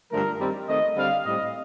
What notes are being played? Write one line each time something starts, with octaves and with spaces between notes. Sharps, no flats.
G2 D3 F3 A3 A#4
D#3 G3 C4
D#3 A3 C4 D#5
D3 G3 C4 F5
A2 G3 C4 D#5